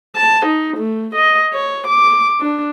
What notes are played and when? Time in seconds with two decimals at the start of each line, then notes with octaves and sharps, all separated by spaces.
0.16 A5
0.46 D#4
0.77 A3
1.15 D#5
1.53 C#5
1.88 D6
2.41 D4